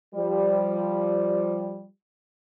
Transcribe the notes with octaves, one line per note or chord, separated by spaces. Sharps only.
F3 G3